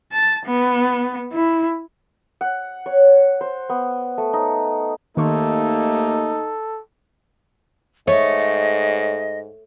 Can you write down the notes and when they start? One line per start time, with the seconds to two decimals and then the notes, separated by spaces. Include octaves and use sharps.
0.11 A5
0.46 B3
1.32 E4
2.41 F#5
2.86 C#5
3.41 C5
3.69 B3
4.18 A3
4.33 D#4
5.17 D#2 D#3 A3 A#3 D#4 A4 C6 C#6
8.07 G#2 A3 C#5 D#5